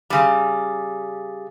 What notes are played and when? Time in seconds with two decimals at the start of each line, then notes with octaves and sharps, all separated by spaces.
0.10 C#3 G3